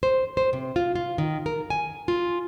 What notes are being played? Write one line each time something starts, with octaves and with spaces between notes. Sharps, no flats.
C5
C5
C3
F4
F4
D#3
A#4
G#5
F4